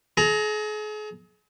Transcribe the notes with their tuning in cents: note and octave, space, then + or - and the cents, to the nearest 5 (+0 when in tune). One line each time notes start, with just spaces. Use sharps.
G#4 +40 A#5 +0